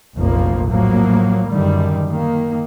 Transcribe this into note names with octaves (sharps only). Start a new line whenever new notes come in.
F1 A#1 F#2 A#2 F3 A#3
A2 F3 F#3 A#3
F#2 D3 D#3 G3
D#3 A#3